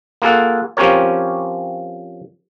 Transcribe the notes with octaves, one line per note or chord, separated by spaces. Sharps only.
A#3 F4 G#4 A4 F#5
F3 C4 C#4 G4 A#4 C#5